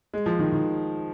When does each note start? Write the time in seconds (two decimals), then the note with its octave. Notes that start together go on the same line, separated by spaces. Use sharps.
0.14 G#3
0.26 F3
0.39 D#3
0.52 D#3